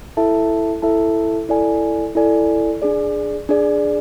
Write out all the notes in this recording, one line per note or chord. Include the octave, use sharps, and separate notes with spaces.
E4 A4 E5 A5
E4 A4 E5 A5
E4 A4 D5 G#5
E4 A4 D5 G#5
D4 G#4 D5
D4 G#4 D5